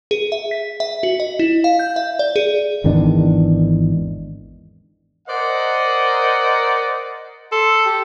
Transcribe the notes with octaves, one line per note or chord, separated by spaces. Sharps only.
G#4
E5
B6
E5
F#4
D#5
E4
F5
G6
E5
D5
G#4
G#1 E2 D#3 D4
A#4 C5 D5 D#5 F#5
A4 C6
G4